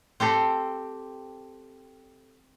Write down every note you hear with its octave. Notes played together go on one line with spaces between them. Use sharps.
C4 G4 A4 C5 G5